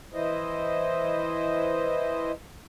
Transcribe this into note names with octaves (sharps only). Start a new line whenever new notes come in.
E3 E4 C5 D#5